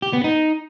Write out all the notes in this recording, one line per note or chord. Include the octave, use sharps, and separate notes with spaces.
G4
B3
D#4